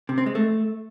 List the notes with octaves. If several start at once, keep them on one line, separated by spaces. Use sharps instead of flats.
C3
C4
G#3
A3